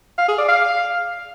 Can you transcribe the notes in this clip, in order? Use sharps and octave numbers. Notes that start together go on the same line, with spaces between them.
F5
G#4
D5
F5